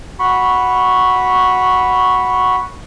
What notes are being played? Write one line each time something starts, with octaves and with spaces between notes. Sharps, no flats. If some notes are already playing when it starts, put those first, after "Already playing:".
F#4 B5 C#6